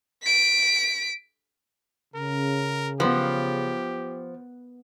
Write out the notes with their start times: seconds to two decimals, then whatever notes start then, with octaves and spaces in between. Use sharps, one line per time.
0.23 B6 D7
2.15 C#3 A#4
3.00 F3 B3 G4 B4